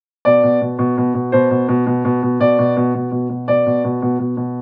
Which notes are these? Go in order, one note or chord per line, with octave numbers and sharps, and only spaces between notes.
B2 D5
B2
B2
B2
B2
B2
B2 C5
B2
B2
B2
B2
B2
B2 D5
B2
B2
B2
B2
B2
B2 D5
B2
B2
B2
B2
B2